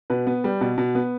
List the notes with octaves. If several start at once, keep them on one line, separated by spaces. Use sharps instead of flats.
B2 B4
B3
G3
B2
B2
B3